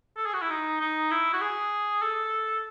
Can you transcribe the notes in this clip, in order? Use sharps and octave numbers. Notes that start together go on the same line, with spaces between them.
A4
G#4
F#4
E4
D#4
D#4
E4
F#4
G#4
A4